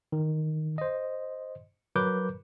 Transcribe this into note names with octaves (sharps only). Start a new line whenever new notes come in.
D#3
C5 D#5
F#3 A#4 B4 D6 G6